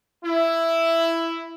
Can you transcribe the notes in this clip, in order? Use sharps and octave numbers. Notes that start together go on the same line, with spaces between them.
E4